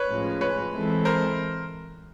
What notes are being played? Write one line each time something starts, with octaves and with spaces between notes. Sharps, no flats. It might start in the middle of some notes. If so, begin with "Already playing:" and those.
Already playing: B4 C#5
A2 F3 G#3 C#4
B4 C#5
E3 G#3 C4 E4 A4
A#4 C5